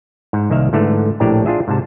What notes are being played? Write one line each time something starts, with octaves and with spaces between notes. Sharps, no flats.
G#2
C2 D#3 A#3 E5 F5
G#2 D3 E3 A3
A#1 A2 D4 G4 E5 A#5
D4 F4 G#4 E5
G#2 C3 A5